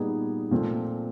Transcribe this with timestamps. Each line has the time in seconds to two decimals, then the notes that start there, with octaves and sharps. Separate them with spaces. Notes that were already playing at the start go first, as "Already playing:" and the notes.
Already playing: A#2 G3 B3 D#4 G#4
0.51 A#2 F3 A3 C4